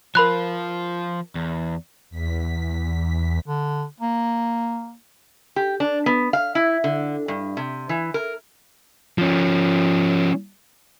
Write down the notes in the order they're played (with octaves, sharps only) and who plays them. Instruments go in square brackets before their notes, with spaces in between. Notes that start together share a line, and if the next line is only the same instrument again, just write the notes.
[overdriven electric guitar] F3 F4 [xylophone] A#4 B5 F#6
[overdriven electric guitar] E2
[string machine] E2 B6
[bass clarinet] D3
A#3
[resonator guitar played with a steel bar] G4
D4
B3
F5
E4
D3
G2
C3
E3
A#4
[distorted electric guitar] F3 C#4